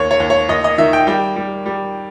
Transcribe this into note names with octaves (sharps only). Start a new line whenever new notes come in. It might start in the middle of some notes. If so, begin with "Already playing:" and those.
Already playing: D#2 C#5
C#5
D#2
C#5
D#2 D#5
D#5
D#3 E5
G5
G3 G5
G3
G3